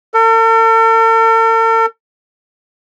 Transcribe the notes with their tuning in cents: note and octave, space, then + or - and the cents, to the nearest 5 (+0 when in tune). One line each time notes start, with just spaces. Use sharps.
A4 +45